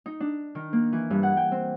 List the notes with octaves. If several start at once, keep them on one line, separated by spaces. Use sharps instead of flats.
D#4
D4
D#3
A#3
E3
G2
F#5
G5
C4